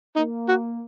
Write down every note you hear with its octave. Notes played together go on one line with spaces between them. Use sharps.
A#3 D#4
F#4